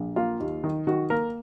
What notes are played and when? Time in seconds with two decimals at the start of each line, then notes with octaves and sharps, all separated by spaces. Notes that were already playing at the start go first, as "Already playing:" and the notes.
Already playing: A#1
0.16 A#3 F4
0.40 D#2
0.64 D#3
0.87 D#3 F#4
1.10 A#3 A#4